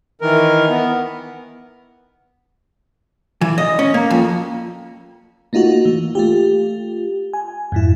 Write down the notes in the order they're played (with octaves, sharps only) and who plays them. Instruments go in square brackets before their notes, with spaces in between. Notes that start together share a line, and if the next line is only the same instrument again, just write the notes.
[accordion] D#3 E3 A#4
B3
[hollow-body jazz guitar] E3
D#5
C#4
A#3
F2
[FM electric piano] A3 A#3 D#4 F4 F#4
E3
A3 F4 G4
G#5
F2 G#2 E4